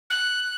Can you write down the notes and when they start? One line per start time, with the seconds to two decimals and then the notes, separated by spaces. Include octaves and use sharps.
0.10 F#6